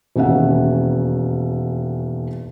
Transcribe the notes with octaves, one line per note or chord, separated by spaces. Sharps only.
E1 D#2 C#4 E5 F#5